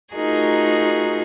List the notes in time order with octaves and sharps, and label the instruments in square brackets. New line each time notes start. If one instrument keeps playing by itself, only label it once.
[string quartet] A3 D#4 F4 F#4 G#4 A#4